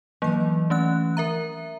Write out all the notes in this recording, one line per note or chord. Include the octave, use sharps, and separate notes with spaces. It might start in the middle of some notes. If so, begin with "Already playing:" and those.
D3 E3 F#3 A#3
A3 C#4 F#6
A#4 E5 A#5